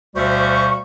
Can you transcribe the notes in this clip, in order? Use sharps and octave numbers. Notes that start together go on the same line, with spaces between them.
D2 B2 G3 C5 F5 C#6